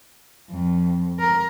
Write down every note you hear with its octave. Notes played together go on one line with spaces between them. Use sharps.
F2
A#4